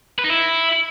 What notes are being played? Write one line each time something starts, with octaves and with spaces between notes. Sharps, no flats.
B4
D#4
E4